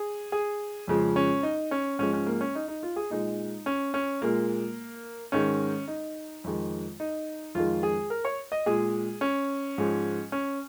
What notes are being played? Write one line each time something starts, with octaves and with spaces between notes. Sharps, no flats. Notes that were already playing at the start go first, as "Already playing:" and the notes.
Already playing: G#4
G#4
F2 C#3 F3 G#3
C#4
D#4
C#4
G#2 F3 G#3 C#4
C#4
A#3
C#4
D#4
D#4
F4
G#4
A#2 G#3 D#4
C#4
C#4
A#2 G#3 A#3
G#2 D#3 G#3 C#4
D#4
F2 D#3 G#3
D#4
F2 D#3 G#3 F4
G#4
A#4
C#5
D#5
A#2 G#3 G#4
C#4
G#2 F3 G#3
C#4